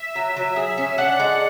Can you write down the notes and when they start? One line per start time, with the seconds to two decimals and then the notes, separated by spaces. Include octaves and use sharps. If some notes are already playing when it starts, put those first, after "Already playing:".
Already playing: E5
0.15 F#3
0.37 F#3
0.56 G#4
0.78 C#4
0.98 D4 F#5
1.20 G#3